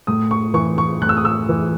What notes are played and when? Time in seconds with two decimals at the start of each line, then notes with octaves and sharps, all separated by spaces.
0.07 A2 D#6
0.31 C#6
0.54 E3 C#6
0.78 C#6
1.01 A2 F#6
1.09 E6
1.17 D#6
1.25 E6
1.49 E3